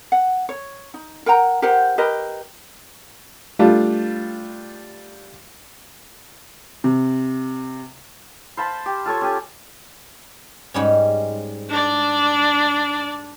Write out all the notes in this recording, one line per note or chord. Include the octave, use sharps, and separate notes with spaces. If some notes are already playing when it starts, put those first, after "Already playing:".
F#5
C#5
D#4
A#4 F#5 G5 A#5
G4 A#4 C5 F#5
G4 A#4 B4 D#5
G3 A3 D4 F4
C3
C5 F5 A5 B5
G4
F4 A4 C#5 C#6
C#4 G4 G#5
G#2 G3 C#4
D4 D5